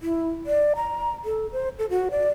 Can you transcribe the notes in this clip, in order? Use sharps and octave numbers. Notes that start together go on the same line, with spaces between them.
E4
D5
A#5
A4
C5
A4
F#4
D5